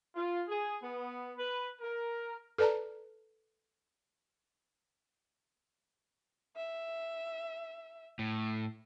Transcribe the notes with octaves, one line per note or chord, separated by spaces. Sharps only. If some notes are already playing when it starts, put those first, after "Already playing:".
F4
G#4
B3
B4
A#4
A4 B4 D5 A5 A#5
E5
A2